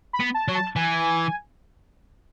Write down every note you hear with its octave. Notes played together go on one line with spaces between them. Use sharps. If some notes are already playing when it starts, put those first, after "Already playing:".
B5
B3
A5
F#3
A5
E3 G#5